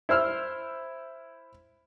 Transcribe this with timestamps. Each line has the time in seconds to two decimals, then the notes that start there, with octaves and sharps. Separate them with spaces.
0.09 E4 C5 E6 F6